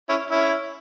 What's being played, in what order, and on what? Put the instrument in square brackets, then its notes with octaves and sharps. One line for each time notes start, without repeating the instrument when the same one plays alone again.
[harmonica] C#4 E4
C#4 E4